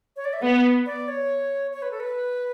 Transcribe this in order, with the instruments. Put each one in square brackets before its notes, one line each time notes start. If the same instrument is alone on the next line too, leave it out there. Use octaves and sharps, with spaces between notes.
[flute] C#5
D5
E5
[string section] B3 [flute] F#5
[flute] D5
C#5
C#5
B4
A4
B4